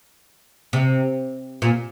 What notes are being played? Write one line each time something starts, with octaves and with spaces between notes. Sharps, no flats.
C3
A#2